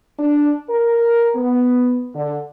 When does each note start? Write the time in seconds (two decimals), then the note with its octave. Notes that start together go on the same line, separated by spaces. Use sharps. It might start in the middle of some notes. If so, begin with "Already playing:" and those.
0.19 D4
0.69 A#4
1.36 B3
2.15 D3